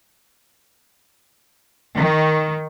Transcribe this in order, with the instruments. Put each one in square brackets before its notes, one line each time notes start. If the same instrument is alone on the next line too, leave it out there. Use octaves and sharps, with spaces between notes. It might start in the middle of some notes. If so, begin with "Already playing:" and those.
[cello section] D#3